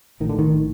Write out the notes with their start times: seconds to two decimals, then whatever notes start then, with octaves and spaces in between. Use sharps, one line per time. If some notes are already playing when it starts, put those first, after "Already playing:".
0.20 A#1 A2 D#3
0.29 D3
0.39 D#3